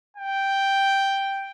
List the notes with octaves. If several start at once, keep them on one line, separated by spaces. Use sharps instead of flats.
G5